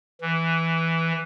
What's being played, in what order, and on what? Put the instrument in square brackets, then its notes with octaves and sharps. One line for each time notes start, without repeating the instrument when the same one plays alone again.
[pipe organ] E3